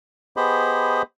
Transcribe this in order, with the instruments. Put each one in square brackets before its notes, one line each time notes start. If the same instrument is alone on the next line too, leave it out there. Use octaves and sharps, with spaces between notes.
[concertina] B3 G4 G#4 C5 D#5 B5